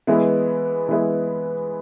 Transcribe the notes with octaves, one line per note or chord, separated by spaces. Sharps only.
E3 G#3 B3 E4
E3 G#3 B3 E4